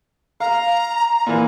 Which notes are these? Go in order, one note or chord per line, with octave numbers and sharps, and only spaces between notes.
F5 A#5
A#2 E3